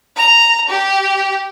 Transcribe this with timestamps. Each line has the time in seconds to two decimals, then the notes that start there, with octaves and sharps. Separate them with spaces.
0.16 A#5
0.69 G4